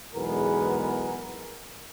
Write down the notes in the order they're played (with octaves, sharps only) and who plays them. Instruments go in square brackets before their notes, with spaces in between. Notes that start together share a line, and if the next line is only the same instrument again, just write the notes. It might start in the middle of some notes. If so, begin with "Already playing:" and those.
[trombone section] B1 E2 G#3 B3 G#4 A#4